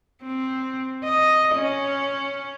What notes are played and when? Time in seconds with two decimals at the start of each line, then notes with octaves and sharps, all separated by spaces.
0.23 C4
1.04 D#5
1.56 C#4